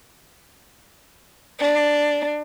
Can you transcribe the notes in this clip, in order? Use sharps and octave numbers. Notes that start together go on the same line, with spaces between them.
D4